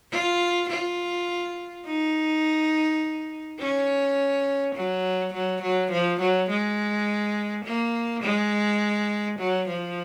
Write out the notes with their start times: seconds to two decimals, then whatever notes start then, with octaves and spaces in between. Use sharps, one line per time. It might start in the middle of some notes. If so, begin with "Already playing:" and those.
0.11 F4
0.69 F4
1.86 D#4
3.59 C#4
4.75 F#3
5.33 F#3
5.62 F#3
5.91 F3
6.20 F#3
6.50 G#3
7.65 A#3
8.23 G#3
9.39 F#3
9.69 F3